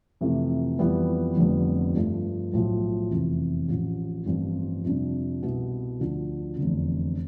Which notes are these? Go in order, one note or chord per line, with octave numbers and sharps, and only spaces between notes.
F2 C3 E3 A3
F2 E3 G3 B3
F1 F2 D3 G3 B3
G2 F3 A3
B1 A2 F3
F1 E2 C3 E3
A1 A2 F3
A1 G2 F3 C4 F4
F2 C3 G3 D4
C2 B2 B3 E4
D2 D3 F3
F1 E2 D3